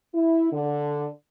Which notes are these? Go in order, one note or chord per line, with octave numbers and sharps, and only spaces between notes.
E4
D3